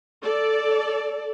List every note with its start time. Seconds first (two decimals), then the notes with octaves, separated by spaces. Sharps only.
0.23 A4 D5